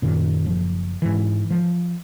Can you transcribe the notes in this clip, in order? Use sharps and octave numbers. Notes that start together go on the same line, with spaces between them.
F#2 A#2 D#3
F#1 F3
G#2 E3
F3